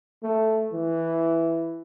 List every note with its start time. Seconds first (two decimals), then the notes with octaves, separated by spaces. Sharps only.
0.23 A3
0.73 E3